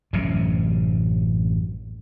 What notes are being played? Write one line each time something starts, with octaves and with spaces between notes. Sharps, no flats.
A1 F#2 A2 C3